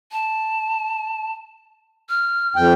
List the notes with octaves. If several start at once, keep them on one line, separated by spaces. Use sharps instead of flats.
A5
F6
F2 G5